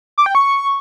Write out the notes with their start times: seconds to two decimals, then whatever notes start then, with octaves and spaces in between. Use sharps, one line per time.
0.18 D6
0.26 G5
0.35 C#6